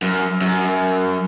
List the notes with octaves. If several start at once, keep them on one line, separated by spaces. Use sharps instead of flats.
F#2
F#2